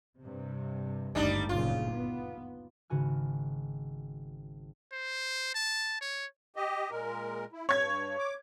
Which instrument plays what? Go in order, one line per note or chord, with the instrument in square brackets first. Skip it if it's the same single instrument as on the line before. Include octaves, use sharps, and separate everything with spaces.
[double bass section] G2 C3
[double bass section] G#1 D2 G2 [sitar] G3 D4 D#4
[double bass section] F#1 A#2 C#3 [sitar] F4
[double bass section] B3
[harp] G#1 C#3 F#4 G#5 F6
[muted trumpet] C5
A5
C#5
[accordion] G4 D#5
A#2 G#3 A#4
E4
[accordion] G2 [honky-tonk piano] C#5 G#6
[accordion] D6